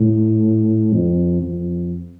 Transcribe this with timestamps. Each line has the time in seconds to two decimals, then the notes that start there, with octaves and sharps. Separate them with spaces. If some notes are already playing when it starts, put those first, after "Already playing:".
Already playing: A2
0.93 F2
1.42 F2